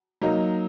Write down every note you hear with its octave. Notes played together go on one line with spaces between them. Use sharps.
F#3 A#3 D#4